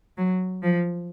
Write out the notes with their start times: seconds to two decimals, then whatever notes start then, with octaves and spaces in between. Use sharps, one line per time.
0.17 F#3
0.62 F3